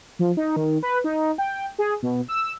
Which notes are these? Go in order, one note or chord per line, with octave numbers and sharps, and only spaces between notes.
F3
D#4
D#3
B4
D#4
G5
G#4
B2
E6